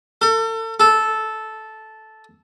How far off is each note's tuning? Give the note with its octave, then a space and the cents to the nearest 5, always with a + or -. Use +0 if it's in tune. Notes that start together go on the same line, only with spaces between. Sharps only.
A4 +35
A4 -10